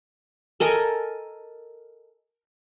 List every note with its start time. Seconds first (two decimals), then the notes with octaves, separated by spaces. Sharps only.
0.60 A4 A#4 D#5 G#5